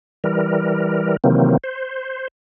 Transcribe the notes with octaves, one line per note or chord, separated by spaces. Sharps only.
E3 G3 A#4
C3 D#3 E3 F#3 A#3 C4
C5